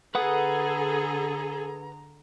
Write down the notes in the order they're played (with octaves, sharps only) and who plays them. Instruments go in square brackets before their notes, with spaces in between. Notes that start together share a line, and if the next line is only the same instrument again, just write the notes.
[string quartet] D3 A#5 [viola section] G#4 A4 [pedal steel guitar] B4 F#5 D#6